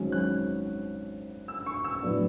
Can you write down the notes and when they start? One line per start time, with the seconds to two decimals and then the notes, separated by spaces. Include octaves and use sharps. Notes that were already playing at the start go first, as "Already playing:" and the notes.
Already playing: G#1 G#2 F#3 C#4
0.12 F#6
1.48 E6
1.66 C#6
1.84 E6
2.02 A2 F#3 B3 D4